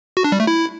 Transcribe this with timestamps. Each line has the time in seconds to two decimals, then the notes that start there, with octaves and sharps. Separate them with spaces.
0.17 F#4
0.24 D4
0.32 G3
0.40 A3
0.47 E4